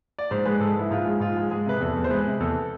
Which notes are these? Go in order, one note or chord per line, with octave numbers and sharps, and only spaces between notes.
D5
G#2 C5
G#3 B4
G#2 A4
G#3 E4
G#2 F4
G#3
G#2 F4
G#3
G#3 G#4
C3 B4
E2 A4
E2
C5
G#3 B4
C3
E2 A4